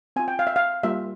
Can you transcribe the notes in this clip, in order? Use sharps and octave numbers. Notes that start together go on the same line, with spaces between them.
C4 F4 G#5
G5
F5
E5
F5
G3 A#3 F4 E5